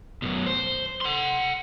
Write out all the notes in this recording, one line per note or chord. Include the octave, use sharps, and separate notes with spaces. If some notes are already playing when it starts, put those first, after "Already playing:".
F#2 B2
C5
F#5 C6